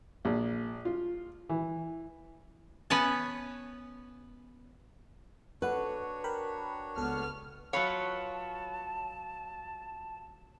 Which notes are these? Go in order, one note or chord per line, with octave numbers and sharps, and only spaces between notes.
A#1
F4
E3
B3 C#4 B4 C#5 G#5 A5
D4 F#4 A4 B4 C#5 F#5
A#4 G5 B5
C#2 B3 A4 F6
F#3 F4 B4 C#5 A5